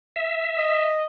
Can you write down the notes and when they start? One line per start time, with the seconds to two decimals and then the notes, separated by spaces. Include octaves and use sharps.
0.16 E5
0.58 D#5